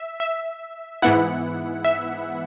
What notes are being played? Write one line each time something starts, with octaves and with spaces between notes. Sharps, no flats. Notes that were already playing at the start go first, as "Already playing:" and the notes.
Already playing: E5
E5
G#2 E3 B3 E4 F#5
E5